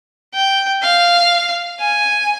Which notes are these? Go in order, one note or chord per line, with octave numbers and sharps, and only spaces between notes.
G5
F5
G#5